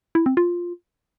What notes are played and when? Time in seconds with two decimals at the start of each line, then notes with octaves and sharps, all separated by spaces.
0.15 E4
0.26 C4
0.37 F4